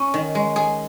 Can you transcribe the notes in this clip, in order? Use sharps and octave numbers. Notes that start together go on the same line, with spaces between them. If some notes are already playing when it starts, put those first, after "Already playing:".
Already playing: C#4
D#3
G#3
G#4